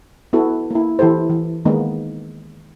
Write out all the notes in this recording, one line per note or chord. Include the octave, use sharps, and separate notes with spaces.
B3 E4 F#4 A4
A#3 E4
E3 E4 G4 A4 C5
E3
D#3 G#3 A#3 B3 D#4